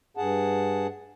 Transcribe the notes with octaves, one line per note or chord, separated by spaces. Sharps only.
G2 G#4 F#5 A5